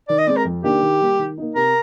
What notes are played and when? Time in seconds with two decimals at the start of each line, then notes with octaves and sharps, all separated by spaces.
0.09 D#3 D5
0.18 D#5
0.27 G#3 C4 D5
0.36 A#4
0.45 F2
0.63 D#3 A#3 D4 G4
0.82 D#3
1.00 G3 A#3
1.19 D#3
1.38 A#3 D#4
1.55 C3 A#4